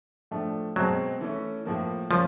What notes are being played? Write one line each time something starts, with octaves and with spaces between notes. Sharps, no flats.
A2 F3 A3 D4
B2 F#3 G#3 C4
E3 A3 C#4
A2 F3 A#3
F3 A#3 C#4